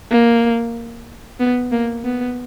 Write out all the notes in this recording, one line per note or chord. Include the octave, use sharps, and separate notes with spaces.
A#3
B3
A#3
B3